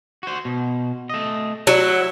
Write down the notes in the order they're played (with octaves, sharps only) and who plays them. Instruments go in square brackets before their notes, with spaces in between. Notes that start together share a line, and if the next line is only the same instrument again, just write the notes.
[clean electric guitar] F#4 C5
B2
A3 D#5
[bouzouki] F#3 [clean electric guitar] E4